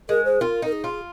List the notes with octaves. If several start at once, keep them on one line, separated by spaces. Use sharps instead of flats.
G#3 A#4
C5
F4 A#4
D#4 A#4
G#4
F4